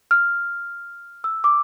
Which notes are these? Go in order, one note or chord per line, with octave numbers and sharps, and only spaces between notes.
F6
E6
D6